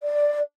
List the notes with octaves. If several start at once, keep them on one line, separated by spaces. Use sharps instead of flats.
D5